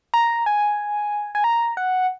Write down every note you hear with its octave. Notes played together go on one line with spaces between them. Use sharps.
A#5
G#5
G#5
A#5
F#5